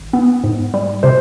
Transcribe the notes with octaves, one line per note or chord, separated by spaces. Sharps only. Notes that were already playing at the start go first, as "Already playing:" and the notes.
Already playing: G#1
B3
G#2
G3
C3 C5